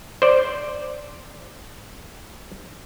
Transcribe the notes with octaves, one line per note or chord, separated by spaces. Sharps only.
C5 D5